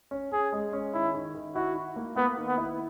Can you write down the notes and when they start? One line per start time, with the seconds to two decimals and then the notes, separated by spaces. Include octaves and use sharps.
0.11 C#4
0.32 C#4 G#4
0.52 G#3
0.73 C#4
0.93 D#3 E4
1.14 D#3
1.35 D#3
1.55 E4 F#4
1.75 E4
1.96 A#3
2.16 A#3 B3
2.38 D#3
2.47 B3
2.57 E4